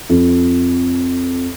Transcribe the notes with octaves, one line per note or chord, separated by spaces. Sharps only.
F2